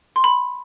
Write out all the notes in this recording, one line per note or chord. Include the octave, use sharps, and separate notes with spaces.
C6
B5